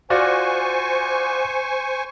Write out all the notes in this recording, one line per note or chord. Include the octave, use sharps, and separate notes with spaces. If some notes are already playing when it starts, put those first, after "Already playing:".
F4 F#4 C5 D5 G#5 C#6